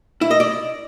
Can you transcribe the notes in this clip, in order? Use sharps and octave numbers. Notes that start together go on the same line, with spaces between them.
E4
D#5
D5